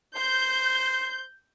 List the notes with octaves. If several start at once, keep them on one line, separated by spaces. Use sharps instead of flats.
C5 G6